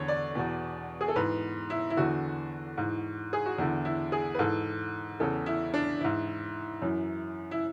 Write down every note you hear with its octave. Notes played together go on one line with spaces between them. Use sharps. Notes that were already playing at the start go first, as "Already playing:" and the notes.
Already playing: E2 D3 C#5
D5
E2 B2
G#4
A4
G#2 E3 B4
E4
E4
E2 D3 F#4
G#2 E3
G#4
F#4
E2 D3 E4
E4
G#4
B4
G#2 E3 A4
E2 C#3 E3 A4
E4
D4
G#2 E3 E4
F#2 E3
E4